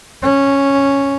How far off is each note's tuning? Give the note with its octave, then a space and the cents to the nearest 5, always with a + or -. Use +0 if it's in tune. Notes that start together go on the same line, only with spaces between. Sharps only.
C#4 -5